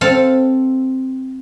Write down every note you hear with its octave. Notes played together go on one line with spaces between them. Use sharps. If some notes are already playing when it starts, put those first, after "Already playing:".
C4 A4 F5